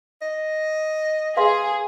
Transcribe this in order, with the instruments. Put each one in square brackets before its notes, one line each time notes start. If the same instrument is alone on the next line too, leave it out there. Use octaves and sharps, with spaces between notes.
[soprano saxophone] D#5
[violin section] G#4 [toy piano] B4 F5 C6